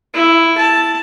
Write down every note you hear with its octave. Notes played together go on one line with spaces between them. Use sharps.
E4
A5